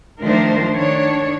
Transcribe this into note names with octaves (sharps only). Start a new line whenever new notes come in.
D#3 F3 A3 D4 A#4 C5
D#3 D4 C#5